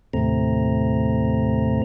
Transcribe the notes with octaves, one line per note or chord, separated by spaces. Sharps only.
D#2 A2 C3 A3 C4 A#5